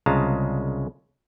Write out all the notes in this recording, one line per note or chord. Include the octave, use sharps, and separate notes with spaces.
C2 C#3 G#3 F4 A5 A#5